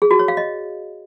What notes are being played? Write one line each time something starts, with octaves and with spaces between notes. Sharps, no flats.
G#4
F#4
C#5
F5
D#5